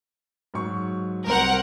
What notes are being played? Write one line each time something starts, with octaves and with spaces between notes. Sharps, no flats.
G#2 F#3 C#6
C2 A#4 C5 F#5